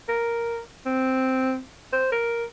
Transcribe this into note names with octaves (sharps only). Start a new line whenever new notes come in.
A#4
C4
C5
A#4